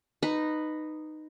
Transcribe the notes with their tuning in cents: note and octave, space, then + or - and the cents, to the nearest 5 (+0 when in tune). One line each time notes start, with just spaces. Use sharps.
D#4 -10 B4 +5